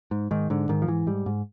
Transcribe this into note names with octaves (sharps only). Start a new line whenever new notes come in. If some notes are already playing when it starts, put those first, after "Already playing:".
G#2
G#2 D#3
G#2 D3
G#2 D#3
F3
G#2 E3
G#2 G3
G#2